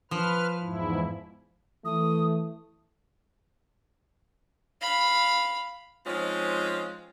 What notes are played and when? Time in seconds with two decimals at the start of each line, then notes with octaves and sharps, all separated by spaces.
0.11 F3 B4 F6
0.62 E2 G#2 E4
1.85 E3 A3 D#6
4.81 F5 B5
6.06 F3 G#3 C4 C#4 D#4 F4